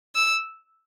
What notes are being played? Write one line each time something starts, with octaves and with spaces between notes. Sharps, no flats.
E6